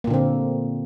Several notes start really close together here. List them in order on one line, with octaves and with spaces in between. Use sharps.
A#3 A#2 D3 C4